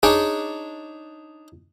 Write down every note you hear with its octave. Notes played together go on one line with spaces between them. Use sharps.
D4 D#4 G#4 C#5